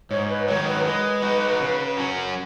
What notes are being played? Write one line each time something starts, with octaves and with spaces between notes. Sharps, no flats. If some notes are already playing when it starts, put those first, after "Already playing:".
G#2 C#5
B4
D#3 F#3 C#5
B4
G#3 B4
D#4 F#4
C#3
F#3 C#4